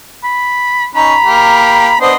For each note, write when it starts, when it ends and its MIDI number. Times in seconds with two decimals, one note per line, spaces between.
0.24 0.86 83
0.95 1.14 61
0.95 1.14 63
0.95 2.00 82
0.95 1.98 83
1.24 1.93 58
1.24 1.93 67
2.01 2.16 59
2.01 2.16 62
2.01 2.10 72
2.01 2.16 75
2.01 2.16 84